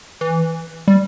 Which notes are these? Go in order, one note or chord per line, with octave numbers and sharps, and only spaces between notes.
E3
G3